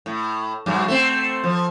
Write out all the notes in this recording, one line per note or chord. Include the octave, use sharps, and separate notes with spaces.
A2
G2 F#3
A3 C4
F3